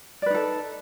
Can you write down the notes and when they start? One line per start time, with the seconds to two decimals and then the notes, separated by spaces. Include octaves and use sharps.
0.22 D5
0.26 B4
0.30 D#4
0.34 A4